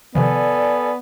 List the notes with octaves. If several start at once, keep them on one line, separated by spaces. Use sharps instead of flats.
C3 D#3 F3 B3 A4 D5 G#5